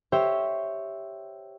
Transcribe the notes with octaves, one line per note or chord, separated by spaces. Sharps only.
G4 C5 C#5 E5 G5